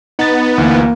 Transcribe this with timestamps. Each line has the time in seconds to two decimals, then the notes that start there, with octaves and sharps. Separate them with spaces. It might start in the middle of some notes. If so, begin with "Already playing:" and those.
0.19 B3 D#4 A6
0.58 D2 E3 A#3